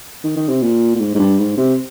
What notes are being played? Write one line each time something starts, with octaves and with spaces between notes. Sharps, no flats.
D#3
D#3
C3
A#2
A#2
G#2
G#2
G2
G#2
C3